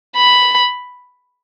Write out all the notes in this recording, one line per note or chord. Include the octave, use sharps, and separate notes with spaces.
B5